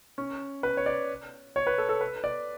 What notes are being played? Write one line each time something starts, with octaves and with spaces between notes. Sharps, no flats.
C#4
B4
C#5
D5
C#5
B4
A4
A4
B4
D5